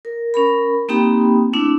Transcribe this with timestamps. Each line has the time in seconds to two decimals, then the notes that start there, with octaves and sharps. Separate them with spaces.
0.05 A#4
0.34 C#4 A#4 B5
0.89 A#3 C4 D#4 G4 G5 B5
1.53 A3 C4 D4 E4